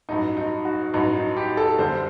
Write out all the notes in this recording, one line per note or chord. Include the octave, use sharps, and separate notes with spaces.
A1 G2 F#3 D#4
D#4
F#4
A1 G2 F#3 D#4
D#4
G4
A4
F#1 F#2 D3 G3 D4 C5